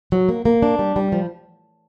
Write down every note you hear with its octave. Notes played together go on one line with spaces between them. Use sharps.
F#3
A#3
A#3
D4
G3
G3
F3